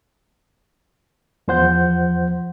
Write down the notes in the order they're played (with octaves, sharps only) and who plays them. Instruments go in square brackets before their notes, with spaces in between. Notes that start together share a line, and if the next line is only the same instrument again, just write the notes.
[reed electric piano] E2 F3 C5 F#5 G6